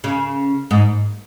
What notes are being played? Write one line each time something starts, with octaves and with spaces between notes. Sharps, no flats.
C#3
G#2